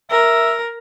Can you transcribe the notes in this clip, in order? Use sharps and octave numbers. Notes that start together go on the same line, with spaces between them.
A#4 E5